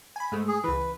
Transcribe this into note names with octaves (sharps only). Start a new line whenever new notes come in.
G#5 B5
G#2 G#3 A3
G#4
C#2 E3 B4